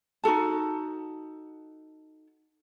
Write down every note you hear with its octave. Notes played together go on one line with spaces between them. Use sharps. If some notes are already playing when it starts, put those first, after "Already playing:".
D#4 F#4 A4 A5